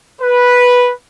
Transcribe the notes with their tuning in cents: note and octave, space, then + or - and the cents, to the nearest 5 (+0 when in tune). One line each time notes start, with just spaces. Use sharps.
B4 -10